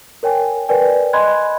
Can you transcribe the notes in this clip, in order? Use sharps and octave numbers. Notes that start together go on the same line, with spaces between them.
A#4 C#5 G5 G#5
A#4 B4 D5 G5 G#5
D#5 G#5 B5 C6 F#6 G#6